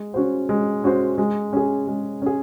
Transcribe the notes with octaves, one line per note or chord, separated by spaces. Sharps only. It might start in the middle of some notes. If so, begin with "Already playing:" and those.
Already playing: G#3
C#4 F#4 C5
G#3
C#4 F#4 C5
G#3
C#4 G#4
G#3
C#4 G#4